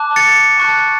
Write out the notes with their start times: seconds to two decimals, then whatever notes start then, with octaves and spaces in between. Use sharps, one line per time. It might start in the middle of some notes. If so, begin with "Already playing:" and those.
Already playing: A5 D6 F#6
0.16 A6 C#7
0.58 A5 C#6 F#6